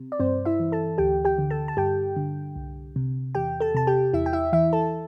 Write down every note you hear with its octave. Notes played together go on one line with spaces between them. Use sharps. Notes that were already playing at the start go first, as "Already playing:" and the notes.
Already playing: C3
D5
G2 C4 C5
E4 E5
E3
A4 A5
D2 G4 G5
G4 G5
D3
A4 A5
A5
G2 G4 G5
D3
C2
C3
E2 G4 G5
A4 A5
C3 A5
G4 G5
E2 E4 E5
G5
E4 E5
E3 E4 E5
A4 A5